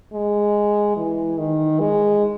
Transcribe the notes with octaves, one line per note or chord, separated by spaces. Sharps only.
G#3
E3
D#3
G#3